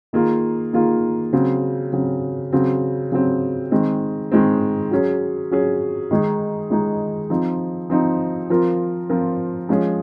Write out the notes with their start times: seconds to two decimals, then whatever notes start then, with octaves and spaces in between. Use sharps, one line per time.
0.13 D#3 A#3 F4 G#4
0.73 D#3 A#3 F4 G#4
1.33 C#3 F#3 C4
1.93 C#3 F#3 C4
2.53 C#3 F#3 C4
3.12 C#3 F#3 C4
3.71 D#3 G#3 C4
4.32 D#3 G#3 C4
4.91 F#3 C#4 G#4
5.51 F#3 C#4 G#4
6.11 D#3 G#3 D#4 G#4
6.70 D#3 G#3 D#4 G#4
7.30 F3 C4 D#4
7.90 F3 C4 D#4
8.50 F3 C4 F4 A#4
9.09 F3 C4 F4 A#4
9.69 F3 G#3 C#4 G#4